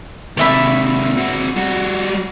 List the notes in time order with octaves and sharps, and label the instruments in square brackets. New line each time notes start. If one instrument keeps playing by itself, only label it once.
[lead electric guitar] D#2 C3 [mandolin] D5 E5 B5
[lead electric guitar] C4 F#4
G3 F#4